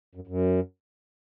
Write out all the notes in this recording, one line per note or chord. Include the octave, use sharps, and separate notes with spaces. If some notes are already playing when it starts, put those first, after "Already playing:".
F#2
F#2